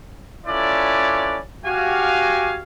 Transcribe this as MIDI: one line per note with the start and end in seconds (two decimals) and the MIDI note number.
0.46 1.38 61
0.46 1.38 64
0.46 1.38 65
0.46 1.38 69
0.46 1.38 71
0.46 1.38 74
1.65 2.62 66
1.65 2.62 67
1.65 2.62 77
1.65 2.62 80